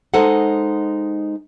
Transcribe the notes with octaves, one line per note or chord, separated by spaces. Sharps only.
G#3 D#4 A4 C5 F#5